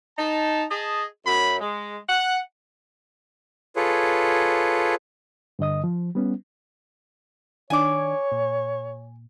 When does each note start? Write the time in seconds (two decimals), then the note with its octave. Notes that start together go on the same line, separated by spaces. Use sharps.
0.18 D#4 A5
0.70 G#4 D#5 A5
1.26 F#2 B5
1.60 G#3
2.08 F#5
3.76 F4 G#4 A4 B4 C#5
5.59 G2 D3 D#5 D#6
5.84 F3
6.15 G3 B3 C#4
7.70 D#3 D4 C#5 G#5 D6
8.32 A#2